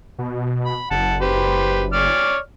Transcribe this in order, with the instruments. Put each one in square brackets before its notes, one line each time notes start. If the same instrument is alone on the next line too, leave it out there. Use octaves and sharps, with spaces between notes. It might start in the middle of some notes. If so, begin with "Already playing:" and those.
[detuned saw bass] B2
[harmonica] B5
[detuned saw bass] F#1 [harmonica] F#5 A5
[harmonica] G4 B4 C5
C#5 D5 F6